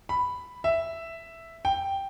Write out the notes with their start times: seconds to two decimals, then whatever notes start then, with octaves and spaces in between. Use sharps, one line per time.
0.09 B5
0.64 E5
1.65 G5